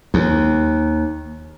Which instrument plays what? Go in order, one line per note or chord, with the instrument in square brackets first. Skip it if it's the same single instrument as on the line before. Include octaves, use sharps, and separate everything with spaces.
[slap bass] D#2